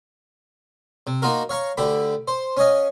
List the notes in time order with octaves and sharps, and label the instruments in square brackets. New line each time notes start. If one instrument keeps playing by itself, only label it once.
[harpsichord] C3
A#3 D#4 F4 F#4 A#4
C#5 F5 A#5 C#6
D2 D3 G4 B5
C5
C#4 C#5 D#5 F5